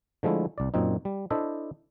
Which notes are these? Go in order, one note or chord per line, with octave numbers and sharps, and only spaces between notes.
D3 F3 G#3 A3 E4
C2 D5
F#2 A#2 C4 D#4
G3
D4 E4 A4 C5 D#5 E5